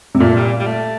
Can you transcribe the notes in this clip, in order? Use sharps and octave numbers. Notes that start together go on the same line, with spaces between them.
C3
A#2 A3
G3
G3
A3